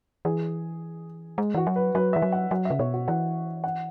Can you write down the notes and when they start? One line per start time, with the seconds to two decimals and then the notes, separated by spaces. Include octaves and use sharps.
0.25 E3 G#4
1.38 G#3
1.54 E3 F#4
1.67 F#3
1.76 B4
1.95 F#3 B4
2.13 E3 E5
2.22 F#3
2.32 F#5
2.51 F#3 F#5
2.65 E5
2.70 C#3
2.79 B2 C#5
2.93 F#4
3.08 E3 F#5
3.64 F#5